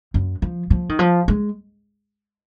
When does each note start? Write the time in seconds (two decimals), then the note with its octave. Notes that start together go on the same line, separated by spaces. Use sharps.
0.14 F#2
0.42 F3
0.70 F3
0.89 D#3
0.99 F3
1.28 G#3